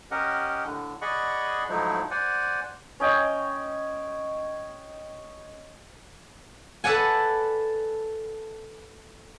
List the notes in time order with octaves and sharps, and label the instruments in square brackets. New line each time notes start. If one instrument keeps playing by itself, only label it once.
[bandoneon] C#4 G4 A#4 D#5 F#5
A2 D3
G#4 D5 D#5 F#5 B5 C#6
G#2 F3 F#3 A3 D#4 E4
C5 D5 F#5 G#5
[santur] C#4 C#5 D#5 G5
[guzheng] A4 B4 D5 F#5 G#5